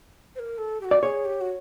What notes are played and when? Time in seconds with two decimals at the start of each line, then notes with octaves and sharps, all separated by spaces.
0.36 C5
0.39 A#4
0.58 A4
0.81 G4
0.85 F#4
0.91 D5
1.02 G#4 C#5
1.25 G4
1.41 F#4